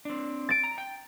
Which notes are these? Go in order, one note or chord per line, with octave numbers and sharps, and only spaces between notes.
C4 D4
A6 D7
A#5
G5